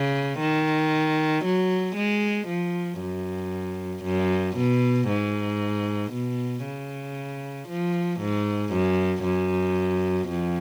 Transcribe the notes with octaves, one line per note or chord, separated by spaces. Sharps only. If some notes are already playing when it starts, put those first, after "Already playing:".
Already playing: C#3
D#3
F#3
G#3
F3
F#2
F#2
B2
G#2
B2
C#3
F3
G#2
F#2
F#2
F2